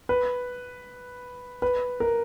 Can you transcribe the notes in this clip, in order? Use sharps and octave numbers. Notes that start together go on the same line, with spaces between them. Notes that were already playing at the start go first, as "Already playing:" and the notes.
B4
B4
A#4